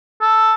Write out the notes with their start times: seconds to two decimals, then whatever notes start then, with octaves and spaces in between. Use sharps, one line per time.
0.21 A4